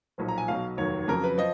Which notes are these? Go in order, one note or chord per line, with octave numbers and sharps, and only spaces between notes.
B1 A#2 F3
A#5
G#5
B1 B2 F#3 F5
F1 D#2 D#3 F#3 C#5
F2 C#3 F#3 A#4
B4
F3 D#5